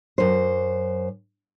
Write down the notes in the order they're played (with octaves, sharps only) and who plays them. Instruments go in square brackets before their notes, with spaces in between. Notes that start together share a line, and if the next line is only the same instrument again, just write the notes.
[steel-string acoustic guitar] F#2 C5